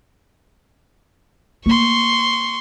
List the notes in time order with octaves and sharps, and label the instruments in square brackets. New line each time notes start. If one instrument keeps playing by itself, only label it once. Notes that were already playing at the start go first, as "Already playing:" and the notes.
[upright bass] A#3 [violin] C6 C#6